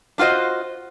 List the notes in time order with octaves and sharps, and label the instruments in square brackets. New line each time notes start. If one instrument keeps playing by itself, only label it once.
[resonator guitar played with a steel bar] D4 F4 F#4 C5 D#5